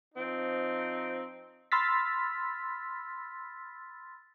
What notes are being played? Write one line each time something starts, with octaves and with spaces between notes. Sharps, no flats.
F3 C4 D#4
B5 C6 E6 F6 A6 B6